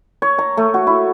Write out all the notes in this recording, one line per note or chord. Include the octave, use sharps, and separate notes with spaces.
C#5
A#5
A3
F#4
E4